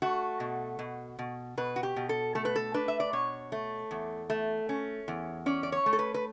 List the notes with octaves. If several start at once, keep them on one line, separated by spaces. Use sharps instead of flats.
A3 F#4
B2
B2
B2
B2 B4
F#4
G4
B2
A4
A3 A4
B4
A4
D4 B4
E5
D5
B2 C#5
A3
E2
A3
C#4
E2
C#4 D5
D5
C#5
A3
A4
B4
B4